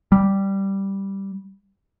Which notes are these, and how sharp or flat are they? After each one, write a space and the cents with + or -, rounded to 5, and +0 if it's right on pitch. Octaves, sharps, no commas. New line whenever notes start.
G3 -5